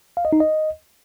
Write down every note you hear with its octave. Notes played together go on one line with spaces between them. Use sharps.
F5
D#5
D#4
D#5